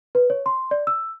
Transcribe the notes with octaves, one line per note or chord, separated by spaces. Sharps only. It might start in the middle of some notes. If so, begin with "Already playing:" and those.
B4
C#5
C6
D5
E6